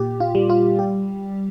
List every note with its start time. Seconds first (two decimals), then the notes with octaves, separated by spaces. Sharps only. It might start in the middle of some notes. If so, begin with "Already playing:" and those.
Already playing: A#2 G4
0.20 F4
0.35 G3
0.50 F4
0.79 G4